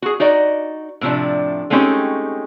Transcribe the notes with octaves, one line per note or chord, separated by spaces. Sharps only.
F#4 G#4
D#4 F#4 D5 D#5
A2 C3 D#3 F3 D4
G#3 A3 C4 C#4 D#4 G4